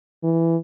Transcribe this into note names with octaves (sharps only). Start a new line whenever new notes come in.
E3